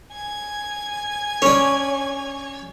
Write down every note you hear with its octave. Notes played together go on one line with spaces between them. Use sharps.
G#5 G#6
C#4 D4 C#5